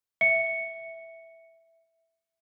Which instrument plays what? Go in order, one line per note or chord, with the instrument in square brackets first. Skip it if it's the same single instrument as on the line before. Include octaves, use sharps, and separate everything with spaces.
[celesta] E5 C#7